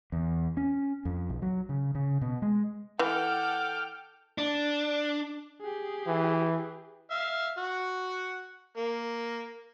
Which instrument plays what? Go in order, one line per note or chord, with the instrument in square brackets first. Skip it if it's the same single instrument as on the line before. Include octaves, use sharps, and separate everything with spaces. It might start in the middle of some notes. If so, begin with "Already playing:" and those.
[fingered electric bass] E2
C#4
F2
B1
F#3
C#3
C#3
B2
G#3
[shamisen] E3 [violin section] A4 D6 [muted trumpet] F#5 [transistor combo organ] G5 F6
[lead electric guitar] D4
[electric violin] G4 G#4
[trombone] E3
[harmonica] E5 F5
F#4 F#5
A#3